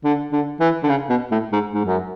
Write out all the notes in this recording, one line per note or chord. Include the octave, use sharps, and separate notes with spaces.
D3
D3
E3
D3
C#3
B2
A2
G#2
G#2
F#2